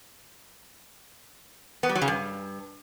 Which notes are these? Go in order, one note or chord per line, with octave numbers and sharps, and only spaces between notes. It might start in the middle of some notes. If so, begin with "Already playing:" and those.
B3
G3
F#3
C#3
G2